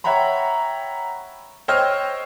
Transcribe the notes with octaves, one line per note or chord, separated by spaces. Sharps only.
C#5 E5 F#5 G5 A#5 B5
C5 C#5 D#5 G5 E6 F6